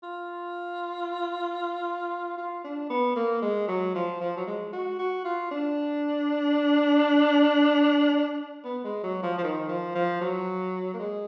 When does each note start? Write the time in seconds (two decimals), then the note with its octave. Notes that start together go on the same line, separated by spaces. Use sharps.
0.03 F4
2.37 F4
2.64 D4
2.90 B3
3.16 A#3
3.42 G#3
3.68 F#3
3.95 F3
4.21 F3
4.37 F#3
4.47 G#3
4.73 F#4
4.99 F#4
5.25 F4
5.51 D4
8.64 B3
8.84 G#3
9.03 F#3
9.23 F3
9.38 F3
9.43 D#3
9.68 F3
9.95 F3
10.21 F#3
10.94 A#3
10.99 G#3